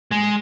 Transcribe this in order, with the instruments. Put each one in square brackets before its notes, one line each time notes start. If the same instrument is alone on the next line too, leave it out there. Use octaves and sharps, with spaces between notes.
[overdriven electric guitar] G#3